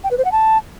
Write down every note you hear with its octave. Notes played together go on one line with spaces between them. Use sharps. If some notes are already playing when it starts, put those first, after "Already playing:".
G5
B4
C5
F#5
A5